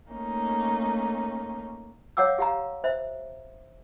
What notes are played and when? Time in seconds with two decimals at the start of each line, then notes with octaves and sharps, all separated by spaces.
0.12 A3 A#3 C#4 D#4
2.17 C#5 F5 F#5 D6 E6
2.38 G4 F5 A#5
2.84 C5 E5